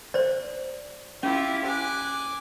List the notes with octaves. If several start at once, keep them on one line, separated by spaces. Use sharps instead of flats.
C5 D5
C#4 E4 F4 G4
G#5 D6 F#6